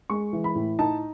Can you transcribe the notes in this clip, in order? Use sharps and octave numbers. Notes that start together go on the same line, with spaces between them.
G#3 C#6
E3
B5
A2
D#4 A5